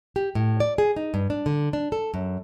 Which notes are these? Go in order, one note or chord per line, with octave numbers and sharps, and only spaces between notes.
G4
A2
D5
G#4
D#4
G2
D4
D3
D4
A4
F#2